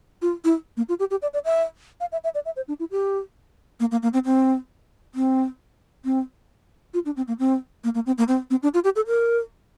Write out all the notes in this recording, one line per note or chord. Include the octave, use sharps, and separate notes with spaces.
F4
E4
A#3
F4
G4
G4
D5
D5
E5
F5
E5
E5
D5
E5
C5
D4
E4
G4
A#3
A#3
A#3
C4
C4
C4
C4
F4
D4
C4
A#3
C4
A#3
A#3
C4
A#3
C4
C4
D4
F4
G4
A4
A#4